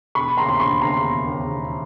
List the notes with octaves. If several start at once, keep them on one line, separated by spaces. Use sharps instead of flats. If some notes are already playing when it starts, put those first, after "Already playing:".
E1 B5 C#6
D#2 C#3 A#5 C6
C6
E1 B5 C#6
D#2 C#3 A#5 C6
E1
D#2 C#3
E1